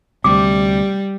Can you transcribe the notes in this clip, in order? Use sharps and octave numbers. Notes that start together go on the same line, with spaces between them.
D2 C3 G3 D6